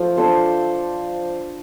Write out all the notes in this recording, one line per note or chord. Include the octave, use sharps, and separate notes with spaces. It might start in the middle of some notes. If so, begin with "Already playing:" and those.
Already playing: F3 A3
D4 A4 C5